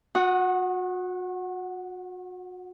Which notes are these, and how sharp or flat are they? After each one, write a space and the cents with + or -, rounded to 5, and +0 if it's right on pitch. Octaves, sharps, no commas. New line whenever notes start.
F#4 -35 F#5 +0 D#6 +0